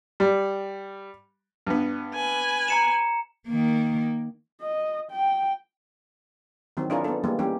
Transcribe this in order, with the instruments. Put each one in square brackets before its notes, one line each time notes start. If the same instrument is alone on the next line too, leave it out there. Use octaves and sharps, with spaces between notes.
[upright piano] G3
[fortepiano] G2 B3
[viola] B4 G#5
[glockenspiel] A#5 C#7 E7
[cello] D#3 A#3
[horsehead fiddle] D#5
G5
[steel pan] D#3 E3 F#3 C4
D4 E4 F4 G#4 A#4 C#5
B3 A4
E3 G3 G#3 A#3
E3 G3 C#4 G4